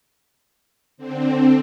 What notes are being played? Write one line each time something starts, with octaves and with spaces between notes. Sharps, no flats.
D3 C4